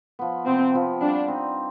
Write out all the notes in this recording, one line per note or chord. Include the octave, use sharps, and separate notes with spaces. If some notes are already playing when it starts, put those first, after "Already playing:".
F3 B3
C3 C4
F3 B3
G3 D4
C4 D#4